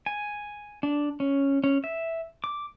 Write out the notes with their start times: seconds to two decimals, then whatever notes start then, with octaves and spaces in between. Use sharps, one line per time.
0.06 G#5
0.83 D4
1.20 C#4
1.64 C#4
1.84 E5
2.44 D6